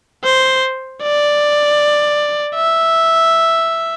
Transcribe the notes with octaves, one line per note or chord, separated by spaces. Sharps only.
C5
D5
E5